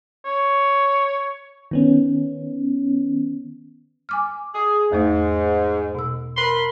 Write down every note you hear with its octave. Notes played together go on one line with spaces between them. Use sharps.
C#5
D#3 B3 C#4
G#5 D6 F6
G#4
E2 G#2 A3 D#4
B2 E6
A#4 B5 C6